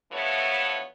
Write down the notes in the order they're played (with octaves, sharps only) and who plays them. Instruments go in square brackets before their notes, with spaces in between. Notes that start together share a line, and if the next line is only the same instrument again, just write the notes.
[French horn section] G2 E3 F3 A3 B3 C#5